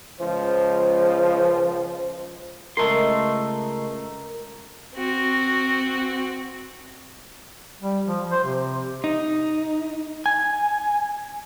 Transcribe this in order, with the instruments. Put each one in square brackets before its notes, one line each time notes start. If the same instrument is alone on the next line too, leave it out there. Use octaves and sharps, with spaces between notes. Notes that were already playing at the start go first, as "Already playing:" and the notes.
[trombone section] C#2 F3 C5
[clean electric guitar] C#2 A3 C6 [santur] A#4 D#5
[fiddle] C4 F#4
[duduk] G3
F3
C5
C3
[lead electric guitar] D#4
G#5